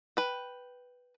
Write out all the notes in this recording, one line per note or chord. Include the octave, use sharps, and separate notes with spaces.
B4 G5